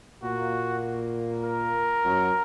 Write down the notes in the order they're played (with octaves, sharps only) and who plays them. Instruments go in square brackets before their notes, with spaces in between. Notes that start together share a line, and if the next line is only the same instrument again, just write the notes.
[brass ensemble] A#2 A#3 [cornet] F#4
[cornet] A#4
[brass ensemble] F#2 F#3